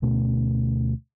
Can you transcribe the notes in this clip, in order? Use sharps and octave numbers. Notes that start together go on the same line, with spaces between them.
D2 B2 A3 C#4